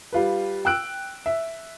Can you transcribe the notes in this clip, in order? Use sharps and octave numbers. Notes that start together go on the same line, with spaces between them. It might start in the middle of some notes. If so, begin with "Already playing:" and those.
G3 F4 B4
G5 E6 F#6 D7
E5